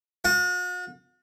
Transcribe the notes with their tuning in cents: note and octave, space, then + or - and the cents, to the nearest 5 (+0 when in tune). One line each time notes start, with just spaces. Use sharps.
F#4 -45